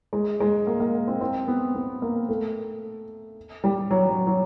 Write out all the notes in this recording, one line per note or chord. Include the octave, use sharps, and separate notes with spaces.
G#3
G#3
A#3
A#3
C4
C4
B3
B3
A#3
A3
G3
F#3
F#3
F#3